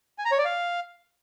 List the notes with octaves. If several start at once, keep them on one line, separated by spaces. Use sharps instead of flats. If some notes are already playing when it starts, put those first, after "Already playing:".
G#5
A#5
C#5
D5
F5